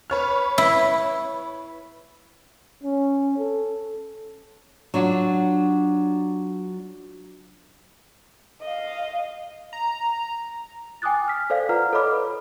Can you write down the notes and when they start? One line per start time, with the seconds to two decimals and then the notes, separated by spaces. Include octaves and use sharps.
0.10 B4 C#5 F6
0.58 E4
2.83 C#4
3.38 A4
4.94 F#3 D4 F4 F#4
8.62 D#5 F5
9.73 A#5
11.02 G5 G#5 D6 D#6 F#6 A6
11.28 F6 B6
11.50 A4 C5 D5 F5
11.69 F4 B4 D5 F#5 A#5 F6
11.93 A4 C#5 D#5 B5 D6 F6
12.12 B4